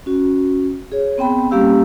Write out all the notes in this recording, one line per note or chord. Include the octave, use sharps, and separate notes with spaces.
C#4 F#4
G#4 C#5
B3 C4 G5 B5
G3 A#3 C#4 G4 F5 E6